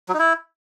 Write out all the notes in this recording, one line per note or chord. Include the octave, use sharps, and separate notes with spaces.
F#3
D#4
E4